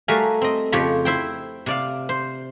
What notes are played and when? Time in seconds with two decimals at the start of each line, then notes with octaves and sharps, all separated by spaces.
0.08 G3 A3 F#4 A#4 F5 G#5
0.42 C4 D#5
0.72 F2 C#3 F3 G4 C#5 B5
1.05 E4 C5 G5
1.66 C3 D5 F5
2.09 C5